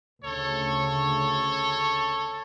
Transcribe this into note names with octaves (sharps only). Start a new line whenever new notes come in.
D2 C#3 A4 C#5